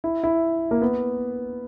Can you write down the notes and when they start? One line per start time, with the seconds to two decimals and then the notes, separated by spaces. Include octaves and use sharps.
0.04 E4
0.23 E4
0.71 A#3
0.82 B3